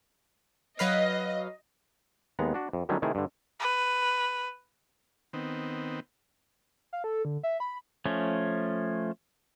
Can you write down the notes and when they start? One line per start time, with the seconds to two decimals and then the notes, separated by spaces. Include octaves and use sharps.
0.79 F#3 B4 D#5 F5
2.39 D#2 G#3 B3 F#5 A#5
2.54 D4 F#4
2.73 F2
2.89 D3 D#3 F#3 G3 A3 C#4
3.02 C3 D#3 A3 E4 G#4
3.15 G2 D3
3.60 B4
5.33 D#3 B3 C4
6.93 F5
7.04 A4
7.25 D3
7.43 E5
7.60 B5
8.06 F3 A3 C#4